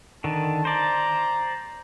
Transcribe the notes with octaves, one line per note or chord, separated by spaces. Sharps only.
D3 D#3 A5
C5 D5 A#5